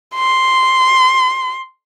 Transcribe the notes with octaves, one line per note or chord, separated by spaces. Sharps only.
C6